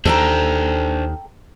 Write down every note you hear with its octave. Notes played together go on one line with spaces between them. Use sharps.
D#2 D4 A4 C5 G5 A#5